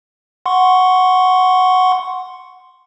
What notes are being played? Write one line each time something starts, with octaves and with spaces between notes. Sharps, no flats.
F#5 C6 C#6